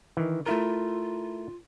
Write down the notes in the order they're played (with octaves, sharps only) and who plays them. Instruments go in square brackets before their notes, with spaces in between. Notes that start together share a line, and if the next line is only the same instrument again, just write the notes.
[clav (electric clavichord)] D#3 E3
[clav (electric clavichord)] A3 E4 A#4 [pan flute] F4